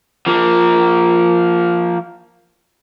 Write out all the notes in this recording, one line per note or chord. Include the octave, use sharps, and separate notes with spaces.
F3 A#3